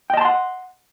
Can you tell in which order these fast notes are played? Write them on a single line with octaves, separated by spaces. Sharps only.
G5 D#5 A5 C6 F#5